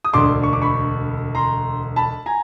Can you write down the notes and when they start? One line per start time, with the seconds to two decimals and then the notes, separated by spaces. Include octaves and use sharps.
0.04 D#6
0.13 E1 D2 D3 C6 D6
0.43 C#6
0.53 D6
0.62 B5 C#6
1.35 A#5 C6
1.96 A5 B5
2.26 G#5 A#5